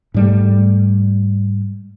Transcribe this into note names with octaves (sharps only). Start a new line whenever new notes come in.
G#2 G3 A3